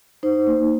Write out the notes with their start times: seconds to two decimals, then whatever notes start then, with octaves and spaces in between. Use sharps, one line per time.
0.23 D#4 C5
0.47 A#3